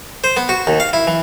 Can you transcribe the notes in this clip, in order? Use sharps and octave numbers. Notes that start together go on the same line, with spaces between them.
C5
B3
F#4
D#2
F5
E4
E3